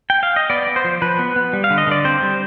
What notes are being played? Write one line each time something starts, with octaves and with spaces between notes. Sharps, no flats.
G5
F5
D#5
B3 D5
B3
C5
F3
F3 B4
B3
B3
G3
F5
D3
D#5
D3 D5
C4 C5
G3